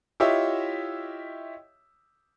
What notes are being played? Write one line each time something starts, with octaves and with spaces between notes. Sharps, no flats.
E4 F4 G4 C#5 D#5 E5